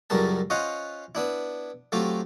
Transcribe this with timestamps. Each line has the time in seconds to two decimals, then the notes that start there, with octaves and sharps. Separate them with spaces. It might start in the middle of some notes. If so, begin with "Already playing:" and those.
0.10 C#2 F#2 F#3 G3 A#4 A5
0.50 C#4 F4 C5 D#5 F#5
1.15 B3 D4 E4
1.92 F#3 A3 C4 F4 G4